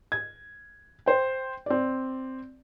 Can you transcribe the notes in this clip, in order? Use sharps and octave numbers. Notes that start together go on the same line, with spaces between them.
G#6
C5 G5
C4 D5